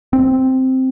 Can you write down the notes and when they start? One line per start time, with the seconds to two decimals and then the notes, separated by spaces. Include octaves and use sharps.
0.13 C4